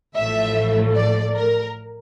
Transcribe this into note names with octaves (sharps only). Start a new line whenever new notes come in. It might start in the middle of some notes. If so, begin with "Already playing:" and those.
A1 A2 F3 A3 E5
D5
A#4